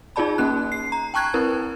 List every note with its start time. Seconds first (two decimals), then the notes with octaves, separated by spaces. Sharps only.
0.16 D#4 F4 G#4 D5 A5 B5
0.38 A#3 C#4 F#6
0.72 C7
0.92 A#5
1.14 G5 A5 C#6 F#6 G#6
1.34 C4 E4 A#4 B4